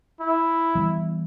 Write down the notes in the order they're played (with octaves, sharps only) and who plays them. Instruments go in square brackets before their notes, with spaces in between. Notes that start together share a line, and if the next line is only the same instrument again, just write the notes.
[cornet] E4
[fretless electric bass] E3 G3 B3